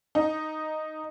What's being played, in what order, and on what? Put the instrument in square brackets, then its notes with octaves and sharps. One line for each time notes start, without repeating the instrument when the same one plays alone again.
[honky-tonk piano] D#4